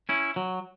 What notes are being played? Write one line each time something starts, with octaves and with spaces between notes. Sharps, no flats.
C#4 E4
F#3